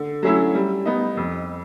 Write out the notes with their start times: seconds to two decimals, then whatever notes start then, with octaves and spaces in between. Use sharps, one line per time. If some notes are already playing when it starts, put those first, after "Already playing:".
Already playing: D3
0.23 F#3 A3 C#4 E4
0.54 G3
0.85 B3 D#4
1.17 F2